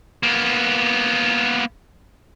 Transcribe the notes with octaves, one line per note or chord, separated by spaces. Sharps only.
A#3 B3